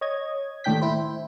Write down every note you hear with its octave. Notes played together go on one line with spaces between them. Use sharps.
C#5 D#5 G#6
D#2 A2 D4 G5 G6 B6
E4 C5